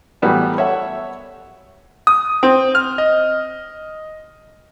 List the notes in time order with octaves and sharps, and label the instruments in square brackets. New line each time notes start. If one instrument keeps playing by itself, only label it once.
[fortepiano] A2 E3 F#3 G3 B3 F#4
A4 C#5 E5 F#5
[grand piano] D#6
C4
F6
D#5